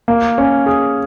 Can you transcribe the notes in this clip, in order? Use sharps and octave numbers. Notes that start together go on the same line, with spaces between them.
A#3
C#4
G#4